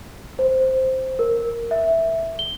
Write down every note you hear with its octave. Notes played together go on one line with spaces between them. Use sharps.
C5
A#4
E5
G7